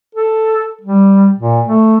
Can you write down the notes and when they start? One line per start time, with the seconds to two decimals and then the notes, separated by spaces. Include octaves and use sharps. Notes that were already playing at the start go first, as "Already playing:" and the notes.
0.15 A4
0.81 G3
1.38 A#2
1.67 A3